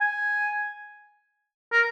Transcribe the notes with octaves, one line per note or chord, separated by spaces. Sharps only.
G#5
A#4